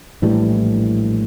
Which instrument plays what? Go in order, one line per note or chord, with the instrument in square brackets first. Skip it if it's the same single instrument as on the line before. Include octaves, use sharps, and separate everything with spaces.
[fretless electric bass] A#1 A2 E3 G3